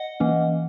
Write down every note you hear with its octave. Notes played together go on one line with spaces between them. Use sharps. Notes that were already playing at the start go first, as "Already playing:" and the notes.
Already playing: D#5 F#5
E3 A#3 C#4